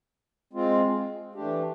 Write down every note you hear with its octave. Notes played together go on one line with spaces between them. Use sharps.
G#3 C4 F4
E3 A3 D4 G4